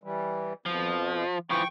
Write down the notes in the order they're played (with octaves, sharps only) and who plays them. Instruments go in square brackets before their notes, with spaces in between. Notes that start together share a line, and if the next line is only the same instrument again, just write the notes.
[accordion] E3 G3
[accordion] F2 B2 [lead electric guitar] F3
[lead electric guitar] E3 F3 [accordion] G5 C#6